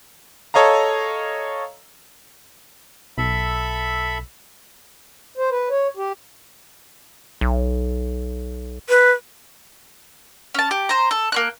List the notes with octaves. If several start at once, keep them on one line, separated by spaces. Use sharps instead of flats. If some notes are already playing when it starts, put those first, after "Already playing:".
A4 C#5 D#5 F5 A#5
B1 A4 E5 B5
C5
B4
C#5
G4
B1
B4
C#4 A5
G4
C5 A#5
A4
A#3 C#4 F#6